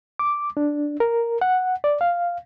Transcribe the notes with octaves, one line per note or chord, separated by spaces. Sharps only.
D6
D4
A#4
F#5
D5
F5